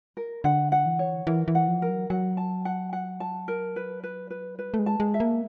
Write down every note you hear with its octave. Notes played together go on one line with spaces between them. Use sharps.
A#4
D3 F#5
F#5
E3
C#5
E3 A#4
E3
F#5
F3
A#4
F#3
F#3 F#5
A5
F#5
F#5
A5
A#4
B4
B4
B4
G3 B4
A3
G#3
A5
G#3
E5
A#3